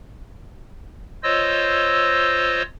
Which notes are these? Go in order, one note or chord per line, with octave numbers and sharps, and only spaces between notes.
F4 C5 C#5 D#5 E6